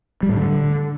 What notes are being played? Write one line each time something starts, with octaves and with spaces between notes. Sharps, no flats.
G3
A2
D3